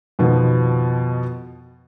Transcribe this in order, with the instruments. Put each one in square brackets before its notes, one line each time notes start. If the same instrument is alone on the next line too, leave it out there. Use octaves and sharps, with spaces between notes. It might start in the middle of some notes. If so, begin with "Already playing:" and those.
[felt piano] F2 B2 D#3 F3 B3